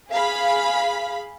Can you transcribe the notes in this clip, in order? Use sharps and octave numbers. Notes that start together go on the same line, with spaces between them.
G#4 F5 B5